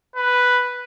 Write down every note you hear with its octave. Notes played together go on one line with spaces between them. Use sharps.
B4